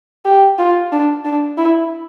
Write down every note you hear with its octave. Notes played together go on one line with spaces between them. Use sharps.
G4
F4
D4
D4
E4